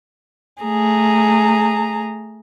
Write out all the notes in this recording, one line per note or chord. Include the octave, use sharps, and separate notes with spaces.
A3 G#4 A#5